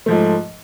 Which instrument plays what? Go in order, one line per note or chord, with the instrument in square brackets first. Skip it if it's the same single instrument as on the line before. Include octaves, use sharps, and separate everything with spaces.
[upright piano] G#2 F3 A3